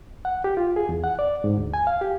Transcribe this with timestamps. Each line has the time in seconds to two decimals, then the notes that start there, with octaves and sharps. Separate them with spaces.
0.25 F#5
0.44 G4
0.57 F4
0.76 G#4
0.89 E2
1.04 F#5
1.19 D5
1.44 G#2
1.57 D2
1.74 G#5
1.87 F5
2.01 G4